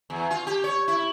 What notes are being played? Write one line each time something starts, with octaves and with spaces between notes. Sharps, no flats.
E2
F4
G4
C#5
E4